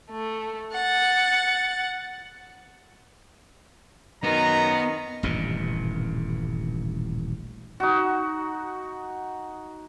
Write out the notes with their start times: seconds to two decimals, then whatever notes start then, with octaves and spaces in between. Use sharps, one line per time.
0.11 A3
0.73 F#5 A6
4.24 F#2 D#3 B3 A#5
5.23 D#1 A1 G2 B2
7.80 D#4 F#4